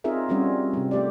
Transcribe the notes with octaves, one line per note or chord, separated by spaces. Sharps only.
C4 D#4 F4 G#4 A#4 E5
G3 C4 C#4 F4 F#4
C3 G3
A3 G4 D5